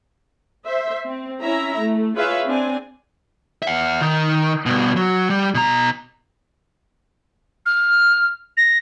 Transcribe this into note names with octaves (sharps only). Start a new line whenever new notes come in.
C5 E5
C4
C#4 E4 E5 A#5
A3
F4 G#4 B4 C#5 E5 F5
C4 D4 G#5
E5 F#5
D#3
G2 B2
F#3
G3
B2 A#5
F6
A#6